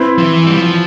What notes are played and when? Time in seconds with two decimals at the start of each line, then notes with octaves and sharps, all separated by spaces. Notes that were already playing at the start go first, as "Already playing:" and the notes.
Already playing: C4 E4 B4
0.18 F3
0.22 E3
0.46 G3
0.56 F3